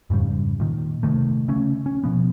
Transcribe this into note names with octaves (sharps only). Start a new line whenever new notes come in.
F2 G#2 C#3 G3
A#2 D#3
C3 D#3 A3
C#3 A3 C#4
C#4
B2 F3 B3